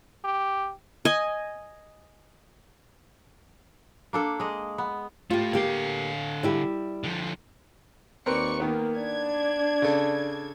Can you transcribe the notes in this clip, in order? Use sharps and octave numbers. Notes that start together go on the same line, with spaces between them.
G4
D#5 G#5
A#3 D4 A4
G#3 D#5
B3
A2 A3 F4 G4
D3 A#3 G4 F5
G3 E4 G4
D3 F3
D#2 C4 A#4 B4 D5 C#6 C#7
D#3 A#3 B3
D4 D5 G#6
C#3 A4